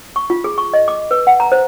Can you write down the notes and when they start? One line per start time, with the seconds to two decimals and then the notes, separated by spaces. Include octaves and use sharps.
0.16 C#6
0.30 F4
0.44 G#4
0.58 C#6
0.74 D#5
0.88 D6
1.11 B4
1.27 F#5
1.40 A#5
1.52 C5